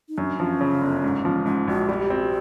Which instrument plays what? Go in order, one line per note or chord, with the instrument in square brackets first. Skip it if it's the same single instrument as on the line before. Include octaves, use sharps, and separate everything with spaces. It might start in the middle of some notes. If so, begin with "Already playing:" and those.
[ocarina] D#4
[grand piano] F#2 [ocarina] D4
[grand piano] F3 [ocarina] C#4
[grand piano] C#3
G1
G#2
F3
[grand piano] G#2 [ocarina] C#4
[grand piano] A#1 [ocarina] F#4
[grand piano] G3 [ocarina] G4
[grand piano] C4 [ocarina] F#4